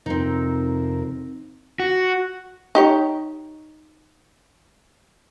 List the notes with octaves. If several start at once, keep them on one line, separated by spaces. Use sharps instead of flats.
F2 C3 C4 D#4 A#4
F#4
D#4 G4 C#5